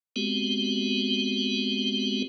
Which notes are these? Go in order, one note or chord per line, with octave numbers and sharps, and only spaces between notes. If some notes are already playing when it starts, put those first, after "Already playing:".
G#3 B3 C4 F#4 G4